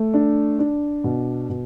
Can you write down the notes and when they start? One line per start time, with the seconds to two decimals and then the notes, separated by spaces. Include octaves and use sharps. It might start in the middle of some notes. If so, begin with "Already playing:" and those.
Already playing: A3
0.14 D4
0.59 D4
1.04 B2
1.49 B2